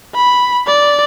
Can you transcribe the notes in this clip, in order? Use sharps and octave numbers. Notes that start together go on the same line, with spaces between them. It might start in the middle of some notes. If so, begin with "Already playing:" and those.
B5
D5